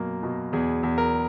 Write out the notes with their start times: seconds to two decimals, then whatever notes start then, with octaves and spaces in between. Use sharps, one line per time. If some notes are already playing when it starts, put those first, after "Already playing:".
Already playing: F#2 B2 A#3
0.23 B2
0.53 E2 G#4
0.83 E2
0.98 A#4